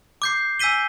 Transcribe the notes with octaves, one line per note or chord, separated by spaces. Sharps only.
D6 G6 C7
G#5 E6 G6 B6 D#7 G7